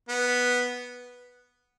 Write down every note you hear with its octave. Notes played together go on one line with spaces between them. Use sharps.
B3